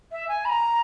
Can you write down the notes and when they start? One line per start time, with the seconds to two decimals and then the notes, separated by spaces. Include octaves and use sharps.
0.11 E5
0.28 G#5
0.44 B5
0.49 A#5